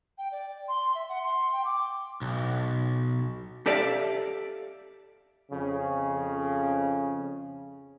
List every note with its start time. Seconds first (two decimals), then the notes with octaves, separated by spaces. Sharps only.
0.18 G5
0.32 D5
0.68 C6
0.95 E5
1.09 F#5
1.23 C6
1.53 G5
1.65 D6
2.22 B1
3.66 G4 A4 D5 E5 F5 A5
5.52 F2 C#3